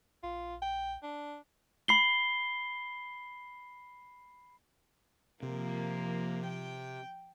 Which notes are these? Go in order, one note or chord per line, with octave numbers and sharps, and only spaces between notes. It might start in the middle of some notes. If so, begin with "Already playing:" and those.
A#1 F4
G5
D4
B5 C7 G7
C3 F3 A#3
G5